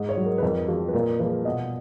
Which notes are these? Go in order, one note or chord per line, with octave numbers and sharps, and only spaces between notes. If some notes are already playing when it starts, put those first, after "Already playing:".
Already playing: G#2 D#5
C#5
F#3
A#4
B4
F2 A#4
F3 G#3 F#4
B4
A#2 A#4
F3 G#3 B4
B2 D#5